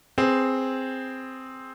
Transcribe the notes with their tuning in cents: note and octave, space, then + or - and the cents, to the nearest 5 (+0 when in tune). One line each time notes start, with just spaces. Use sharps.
C4 +0 G#4 +0 B4 +20